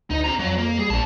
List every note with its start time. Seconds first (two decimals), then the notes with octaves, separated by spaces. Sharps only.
0.10 D2 D#4 D#5
0.24 C4 A#5
0.39 F2 F#3
0.58 A#3
0.79 G3 G#4
0.90 A#1 F2 A5